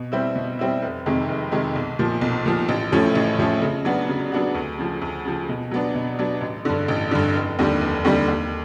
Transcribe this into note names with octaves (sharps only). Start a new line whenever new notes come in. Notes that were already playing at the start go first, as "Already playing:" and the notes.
Already playing: B2
G3 C4 E4
B2
G3 C4 E4
F1
F2 C3 D#3 G#3
F1
F2 C3 D#3 G#3
B1
A#2 F3
B1
A#2 F3
A1
A2 F3 A3 C#4
A1
A2 F3 A3 C#4
C#3
F#3 B3 D4 F#4
C#3
F#3 B3 D4 F#4
D2
C#3 F3
D2
C#3 F3
B2
F#3 B3 D4
B2
F#3 B3 D4
A1
G2 D3
A1
G2 D3
F1
D#2 D3 G3
F1
D#2 D3 G3
D#2